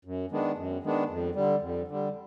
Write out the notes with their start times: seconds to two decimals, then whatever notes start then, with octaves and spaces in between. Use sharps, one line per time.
0.05 F#2
0.31 D#3 G#3 B3 D4
0.57 F#2
0.83 D#3 G#3 B3 D4
1.09 F2
1.35 D3 G3
1.61 F2
1.88 D3 G3